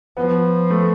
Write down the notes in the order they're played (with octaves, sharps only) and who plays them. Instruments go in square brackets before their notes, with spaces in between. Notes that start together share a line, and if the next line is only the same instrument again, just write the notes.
[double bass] F3 [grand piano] B3
[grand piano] A3